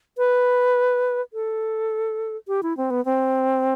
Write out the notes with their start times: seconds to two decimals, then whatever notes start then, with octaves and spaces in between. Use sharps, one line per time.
0.18 B4
1.33 A4
2.48 G4
2.63 E4
2.77 C4
2.90 B3
3.05 C4